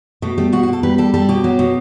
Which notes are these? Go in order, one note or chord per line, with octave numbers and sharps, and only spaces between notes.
B2 A3
G3 A3
B2 F#4
F#4
B2
A4
G3 B4
G3 A4
G3 A4
B2 G4
F#3
B2